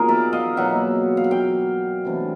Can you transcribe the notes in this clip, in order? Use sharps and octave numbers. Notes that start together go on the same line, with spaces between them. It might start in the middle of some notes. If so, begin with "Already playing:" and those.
Already playing: A#2 F#3 B3 D#4 G#4 A#4
D5 E5
D#5 F5
B2 F#3 A#3 E5 F#5
F5
F#5
F5 G5
C3 E3 A3 D4